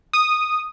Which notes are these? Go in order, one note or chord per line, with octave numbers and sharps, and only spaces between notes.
D#6